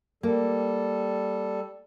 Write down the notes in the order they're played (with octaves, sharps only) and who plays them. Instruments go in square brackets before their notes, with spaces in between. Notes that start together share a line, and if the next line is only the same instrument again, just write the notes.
[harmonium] G3 A4 [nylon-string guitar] A#3